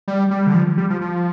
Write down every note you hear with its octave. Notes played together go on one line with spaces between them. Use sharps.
G3
G3
D3
F3
G3
F3
F3